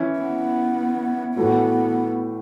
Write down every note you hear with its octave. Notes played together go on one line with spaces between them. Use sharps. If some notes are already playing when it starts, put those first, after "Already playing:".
Already playing: E3 C#4 E4
B3
A2 E3 A3 B3 F#4